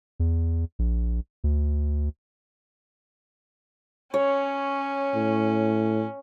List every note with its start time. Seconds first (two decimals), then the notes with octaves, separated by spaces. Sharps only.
0.20 E2
0.79 A#1
1.44 D2
4.14 C#4 C#5
5.15 A2